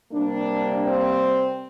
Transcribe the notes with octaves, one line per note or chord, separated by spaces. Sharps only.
C3 G3 A#3 D4
C4